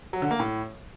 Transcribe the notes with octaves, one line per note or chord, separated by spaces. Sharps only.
F#3
D3
A#3
A2